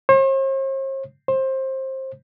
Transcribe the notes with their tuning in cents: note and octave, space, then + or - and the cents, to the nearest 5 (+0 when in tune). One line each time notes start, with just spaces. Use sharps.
C5 +45
C5 +20